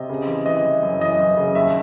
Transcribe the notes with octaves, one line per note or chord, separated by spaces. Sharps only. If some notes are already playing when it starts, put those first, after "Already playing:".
Already playing: C3 D#5
C#3
E3
E3 D#5
E3
F#2
E3 D#5
F#2
C#3
D#2 E5